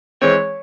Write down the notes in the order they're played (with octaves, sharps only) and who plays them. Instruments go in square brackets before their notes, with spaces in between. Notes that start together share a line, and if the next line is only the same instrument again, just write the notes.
[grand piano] E3 G#3 C4 [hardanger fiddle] C#5